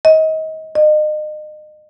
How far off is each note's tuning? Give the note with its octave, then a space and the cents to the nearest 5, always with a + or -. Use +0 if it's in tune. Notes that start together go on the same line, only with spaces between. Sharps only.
D#5 +30
D#5 -35